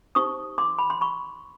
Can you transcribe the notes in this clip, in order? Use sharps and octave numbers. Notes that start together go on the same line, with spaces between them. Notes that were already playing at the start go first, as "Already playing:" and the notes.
D#4 G4 C5 C#6 D#6
C6 D6
B5
C6
B5 C#6